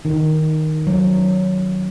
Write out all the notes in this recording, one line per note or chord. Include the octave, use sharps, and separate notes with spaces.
D#3
F#3